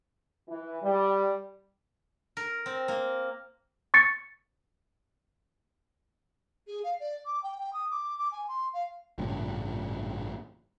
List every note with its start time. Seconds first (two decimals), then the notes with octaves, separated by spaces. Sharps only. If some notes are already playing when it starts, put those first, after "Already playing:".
0.49 E3
0.83 G3
2.37 A#4
2.66 C4
2.88 A#3
3.94 C#6 A6 C#7
6.67 G#4
6.84 F5
7.00 D5
7.25 D6
7.43 G5
7.58 G5
7.73 D#6
7.91 D6
8.18 D6
8.32 G#5
8.48 C6
8.74 F5
9.18 A1 G2 A#2 C#3